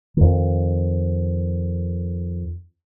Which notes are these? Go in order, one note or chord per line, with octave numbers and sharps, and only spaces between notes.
F2 D#3